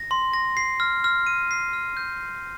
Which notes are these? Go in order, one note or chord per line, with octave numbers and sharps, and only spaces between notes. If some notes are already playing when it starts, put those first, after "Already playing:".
Already playing: A#6
C6
A#6
C7
F6
F6
D#7
C7
F6
G6
C7